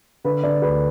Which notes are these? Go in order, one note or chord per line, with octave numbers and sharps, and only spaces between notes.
D3 B4
D3 D5
D2 B4